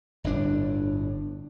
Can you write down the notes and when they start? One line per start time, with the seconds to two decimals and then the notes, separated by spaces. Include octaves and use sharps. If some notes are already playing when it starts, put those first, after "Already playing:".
0.24 G1 A2 D4